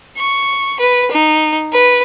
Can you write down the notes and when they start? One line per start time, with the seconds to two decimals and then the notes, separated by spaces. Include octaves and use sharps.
0.17 C#6
0.79 B4
1.11 D#4
1.72 B4